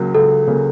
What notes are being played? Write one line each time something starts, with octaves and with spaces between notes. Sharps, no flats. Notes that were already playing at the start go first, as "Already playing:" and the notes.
Already playing: C#2 C#3 F#3 A#3
C#2 A4
C#3 F#3 A#3